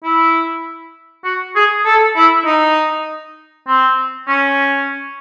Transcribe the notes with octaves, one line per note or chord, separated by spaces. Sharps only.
E4
F#4
G#4
A4
E4
D#4
C4
C#4